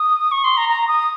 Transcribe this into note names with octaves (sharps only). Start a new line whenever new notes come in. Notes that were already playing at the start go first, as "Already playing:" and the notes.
Already playing: D#6
C#6
C6
A#5
A#5
D#6